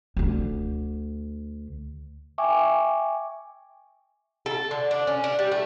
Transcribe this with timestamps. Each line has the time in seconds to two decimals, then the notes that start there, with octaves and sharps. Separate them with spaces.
0.17 D2 D3
2.38 E5 G5 G#5 C#6 D6
4.46 A4
4.71 D3
4.91 D4
5.07 C#4
5.24 D4
5.39 G3
5.51 A3